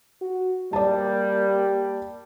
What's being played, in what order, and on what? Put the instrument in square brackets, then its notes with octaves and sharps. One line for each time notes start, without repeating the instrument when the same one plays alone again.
[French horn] F#4
[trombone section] G3 [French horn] A#3 [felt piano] D5 A5